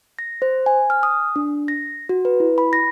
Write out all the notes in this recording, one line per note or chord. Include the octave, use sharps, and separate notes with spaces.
A#6
C5
G#5
F6
D#6
D4
A#6
F#4
B4
E4
B5
A#6